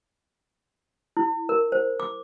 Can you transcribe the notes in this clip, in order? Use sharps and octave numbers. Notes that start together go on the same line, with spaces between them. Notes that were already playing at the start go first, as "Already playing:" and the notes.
E4
A#4
C5
D6